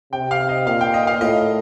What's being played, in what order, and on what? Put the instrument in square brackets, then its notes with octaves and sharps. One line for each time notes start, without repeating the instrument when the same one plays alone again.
[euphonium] C3 [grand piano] G5
[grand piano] F5
D#5
[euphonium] A#2 [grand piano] F5
[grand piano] G5
D#5
F5
[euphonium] A2 [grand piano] D#5